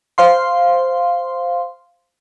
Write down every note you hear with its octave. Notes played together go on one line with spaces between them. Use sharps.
C5 F5 C6